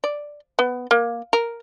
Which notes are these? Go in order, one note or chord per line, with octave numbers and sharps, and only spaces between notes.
D5
B3
A#3
A#4